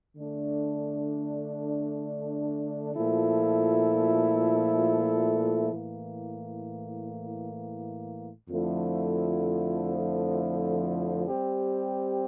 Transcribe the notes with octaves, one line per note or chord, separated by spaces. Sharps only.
D3 A3 D4
A#2 F3 A3 E4 A4
A2 E3 A#3
F2 D3 F3 A3 E4
G3 C4 G4